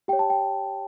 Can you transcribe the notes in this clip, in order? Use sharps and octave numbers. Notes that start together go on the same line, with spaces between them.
G4 C#5 G5
A5
G5